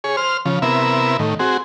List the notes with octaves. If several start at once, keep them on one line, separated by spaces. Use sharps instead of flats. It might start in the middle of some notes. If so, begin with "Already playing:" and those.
G#4 C#5
C5 F6
C#3 F3
C3 B3 E4 A#4 E5
A2 D#3
C4 F#4 G#4